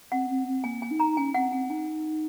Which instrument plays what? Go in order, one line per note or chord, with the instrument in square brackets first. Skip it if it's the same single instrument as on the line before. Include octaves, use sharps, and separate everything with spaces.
[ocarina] C4 [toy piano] F#5
[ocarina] C4
C4
[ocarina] A#3 [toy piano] G#5
[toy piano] G#5
[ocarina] D#4
[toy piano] A#5
[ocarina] C#4 [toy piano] G#5
[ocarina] C4 [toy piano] F#5
[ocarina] C4 [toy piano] G#5
[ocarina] D#4 [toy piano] G#5